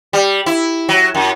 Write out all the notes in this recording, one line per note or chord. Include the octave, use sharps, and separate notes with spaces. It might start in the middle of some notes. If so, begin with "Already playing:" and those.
G3
E4
F#3
F#2